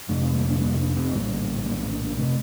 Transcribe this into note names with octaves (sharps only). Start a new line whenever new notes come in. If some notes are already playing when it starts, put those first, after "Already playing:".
F1 F2 C3 F3 A3
A3 C4
G3 A#3
A#3 D4
G3 A#3
A#3 D4
A3 C4
A#1 A2 G3 A#3
G3 A#3
A3 C4
A#3 D4
A#3 D4
C3 A3 C4